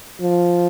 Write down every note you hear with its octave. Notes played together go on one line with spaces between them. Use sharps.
F3